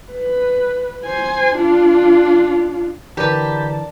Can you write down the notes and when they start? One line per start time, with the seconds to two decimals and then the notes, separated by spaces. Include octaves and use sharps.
0.11 B4
1.05 C5 G#5
1.55 D4 F4
3.17 D3 E3 G4 A#4 B4 D5 A5